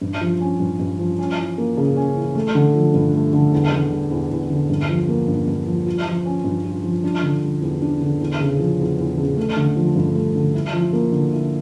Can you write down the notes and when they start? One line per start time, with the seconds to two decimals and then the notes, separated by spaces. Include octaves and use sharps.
0.01 G2
0.21 F3
0.41 C#4
0.60 G2
0.80 G2
0.99 F3
1.19 C#4
1.38 E3
1.58 A#3
1.77 C#3
1.96 C#4
2.16 E3
2.35 A3
2.55 D3
2.74 F3
2.94 G2
3.14 A3
3.33 D3
3.53 E2
3.72 D3
3.92 G3
4.11 E2
4.31 E2
4.50 D3
4.70 G2
4.89 F3
5.08 A#3
5.28 G2
5.47 G2
5.67 F3
5.86 F4
6.06 F3
6.25 C#4
6.44 G2
6.64 F4
6.84 F3
7.04 D4
7.23 D3
7.43 G3
7.61 E2
7.82 D4
8.01 D3
8.20 E2
8.40 C#3
8.59 F3
8.79 E2
8.98 E2
9.18 C#3
9.37 A3
9.57 D3
9.76 F3
9.95 G2
10.15 A3
10.35 D3
10.54 E4
10.73 F3
10.93 A#3
11.12 D3
11.32 E4